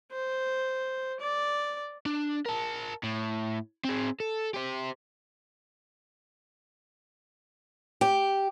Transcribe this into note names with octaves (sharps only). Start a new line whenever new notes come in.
C5
D5
D4
A#4 A5
A2
C4 G#4
A4
G4 C5
G4